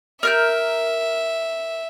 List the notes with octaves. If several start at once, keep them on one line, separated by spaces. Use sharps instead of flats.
A#4 E5 F6 G6